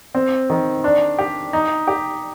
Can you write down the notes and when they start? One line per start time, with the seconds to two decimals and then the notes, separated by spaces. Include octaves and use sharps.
0.15 C4
0.50 D#3
0.84 D4
1.18 G4
1.53 D#4
1.87 G4